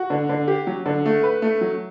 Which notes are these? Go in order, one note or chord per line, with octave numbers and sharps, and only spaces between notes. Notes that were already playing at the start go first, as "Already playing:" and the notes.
Already playing: F#4
D3
D3
G4
F#3
D3
A3
B4
A3
F#3